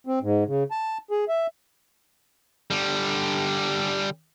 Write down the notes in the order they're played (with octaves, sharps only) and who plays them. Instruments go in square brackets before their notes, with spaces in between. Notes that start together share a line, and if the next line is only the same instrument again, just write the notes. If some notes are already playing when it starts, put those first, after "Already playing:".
[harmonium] C4
G#2
C#3
A5
G#4
E5
[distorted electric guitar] D3 G3